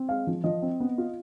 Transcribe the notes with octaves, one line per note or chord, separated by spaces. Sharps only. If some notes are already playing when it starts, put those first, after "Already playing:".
Already playing: C4
G#3 F5
F3
F3 D#5
C4
B3
F4